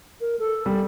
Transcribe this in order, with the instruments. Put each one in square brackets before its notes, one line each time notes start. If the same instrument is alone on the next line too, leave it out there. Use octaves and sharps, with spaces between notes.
[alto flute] A#4
A4
[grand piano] G3